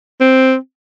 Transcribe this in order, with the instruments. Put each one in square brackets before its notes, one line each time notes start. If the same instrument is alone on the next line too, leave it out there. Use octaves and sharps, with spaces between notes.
[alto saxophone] C4